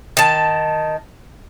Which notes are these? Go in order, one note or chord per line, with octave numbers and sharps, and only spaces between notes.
D#3 A5